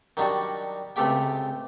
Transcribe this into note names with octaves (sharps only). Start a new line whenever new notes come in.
D#3 F#3 G3 D4 F#4
C#2 C3 A3 G4 G5